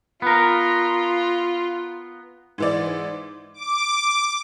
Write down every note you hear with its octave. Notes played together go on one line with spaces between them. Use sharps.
B3 F4 A#4
G#2 E3 D5
D6